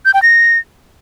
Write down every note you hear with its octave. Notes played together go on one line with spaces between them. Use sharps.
G6
G5
A#6